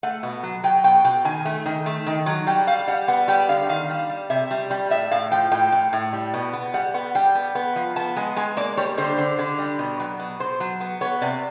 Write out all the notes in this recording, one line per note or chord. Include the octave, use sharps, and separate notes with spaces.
A3 F#5
B2
F#3
F#3 G5
B2 G5
B2 G5
D#3 G#5
A3
D#3
A3
D#3
F#3
G3 G5
G3 F5
G3 F#5
B3 F#5
G3 G5
D3 F5
D#3 F5
G3
G3
C3 E5
G3
G3
A2 E5
A2 F5
F3 G5
A2 G5
A2
A2
G3
B2
B3
G3 F#5
B3 F#5
G3 G5
B3
B3
F3
B3 A5
G#3 G#5
G#3 G#5
A#3 D5
G3 C#5
D3 C5
D3
D3
G3
B2
F#3
B2
B2 C5
F#3
B3
B3 C#5
C3 D5